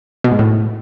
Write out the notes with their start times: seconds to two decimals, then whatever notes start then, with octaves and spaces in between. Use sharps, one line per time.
0.24 B2
0.32 G#2
0.39 A2